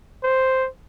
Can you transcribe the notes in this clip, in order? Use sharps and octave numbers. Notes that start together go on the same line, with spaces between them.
C5